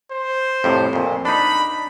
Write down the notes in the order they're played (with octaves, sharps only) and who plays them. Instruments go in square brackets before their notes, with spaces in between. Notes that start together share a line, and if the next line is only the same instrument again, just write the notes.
[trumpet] C5
[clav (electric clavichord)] F2 A2 C3
F2 A#2
[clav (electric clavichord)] D4 D#4 [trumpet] B5